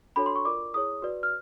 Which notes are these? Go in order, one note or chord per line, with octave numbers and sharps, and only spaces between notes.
D4 F#4 A4 C#5 B5
C6
C#6
F4 A#4 D5 D6
E4 G#4 C#5 D#6
F#4 B4 D5
F6